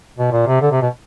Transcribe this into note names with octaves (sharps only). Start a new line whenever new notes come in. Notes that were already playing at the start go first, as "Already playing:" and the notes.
B2
A#2
C3
D3
C3
B2